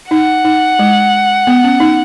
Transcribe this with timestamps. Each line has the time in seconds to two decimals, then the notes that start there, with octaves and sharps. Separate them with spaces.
0.11 D#4 F#5
0.45 D#4
0.79 G#3
1.47 B3
1.64 C#4
1.80 D#4